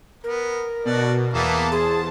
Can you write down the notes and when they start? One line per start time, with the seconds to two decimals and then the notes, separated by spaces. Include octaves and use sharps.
0.24 B3 A#4
0.85 B2 D4 F#4 D5
1.33 E2 E3 A#3 B3 A5
1.72 G#4 C5